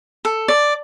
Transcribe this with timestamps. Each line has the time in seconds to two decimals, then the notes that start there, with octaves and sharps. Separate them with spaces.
0.25 A4
0.48 D5